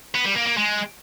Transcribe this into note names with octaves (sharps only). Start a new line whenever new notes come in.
B3
G3
A#3
A#3
G#3